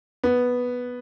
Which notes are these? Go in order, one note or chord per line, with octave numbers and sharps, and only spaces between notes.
B3